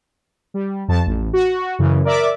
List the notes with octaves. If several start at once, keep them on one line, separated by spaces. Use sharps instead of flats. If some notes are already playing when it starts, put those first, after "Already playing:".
G3
F2 F3 A5
A1
F#4
F#2 C#3 E3
A#4 D5 E5 D6